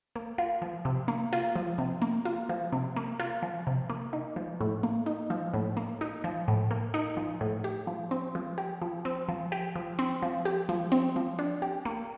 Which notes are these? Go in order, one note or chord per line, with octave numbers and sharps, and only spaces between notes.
A#3
F4
F3
C3
A#3
F4
F3
C3
A#3
F4
F3
C3
A#3
F4
F3
C3
A#3
D#4
F3
A2
A#3
D#4
F3
A2
A#3
D#4
F3
A2
A#3
D#4
F3
A2
G4
F3
C4
F3
G4
F3
C4
F3
G4
F3
C4
F3
G4
F3
C4
F3
D4
G4
A#3